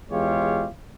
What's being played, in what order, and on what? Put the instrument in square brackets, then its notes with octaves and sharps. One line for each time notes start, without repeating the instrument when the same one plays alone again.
[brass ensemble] E2 G#3 F4 G4 C#5